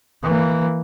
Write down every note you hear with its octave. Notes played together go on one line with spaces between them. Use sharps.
E3 A#3